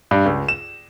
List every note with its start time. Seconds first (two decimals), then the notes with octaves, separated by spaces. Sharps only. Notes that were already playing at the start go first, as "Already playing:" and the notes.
0.11 G2
0.26 C#2
0.48 E7